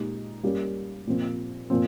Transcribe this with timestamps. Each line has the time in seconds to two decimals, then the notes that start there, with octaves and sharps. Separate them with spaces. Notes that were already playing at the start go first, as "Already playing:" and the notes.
Already playing: A#2 G#3 D#4 G4
0.43 G3 A#3 C#4 G4
1.07 A#2 F3 C4
1.70 A#2 F3 C4